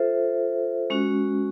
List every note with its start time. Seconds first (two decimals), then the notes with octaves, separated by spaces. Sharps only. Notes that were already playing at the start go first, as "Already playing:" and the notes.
Already playing: F4 A4 C5 E5
0.90 G#3 C#4 F#4